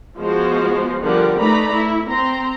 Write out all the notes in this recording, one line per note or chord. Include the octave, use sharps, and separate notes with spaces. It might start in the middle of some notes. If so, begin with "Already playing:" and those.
F3 G#3 B3 F4 F#4 C5
D3 F3 G3 G4 A#4 F#5
A3 D#4 B4 D5 A#5 B5
E4
C4 A#5 C6